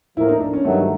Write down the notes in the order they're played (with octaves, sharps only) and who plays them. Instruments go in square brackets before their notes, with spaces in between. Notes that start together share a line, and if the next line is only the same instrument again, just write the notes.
[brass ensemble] A2 F3 A#3 [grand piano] E4
[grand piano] D#4
D4
C#4
[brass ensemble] G2 D#3 F#3 [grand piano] A3